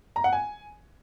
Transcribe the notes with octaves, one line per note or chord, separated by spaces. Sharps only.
A#5
F#5
G#5